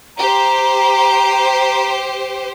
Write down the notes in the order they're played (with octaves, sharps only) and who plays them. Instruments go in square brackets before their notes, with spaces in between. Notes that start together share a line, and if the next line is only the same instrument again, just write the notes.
[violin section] G4 C5 [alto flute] A#5